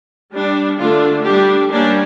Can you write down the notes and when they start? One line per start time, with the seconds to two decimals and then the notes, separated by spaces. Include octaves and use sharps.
0.32 G3 D4
0.78 D3 A3 D4 F4
1.25 G3 D4 G4
1.72 G3 A#3 C#4 D4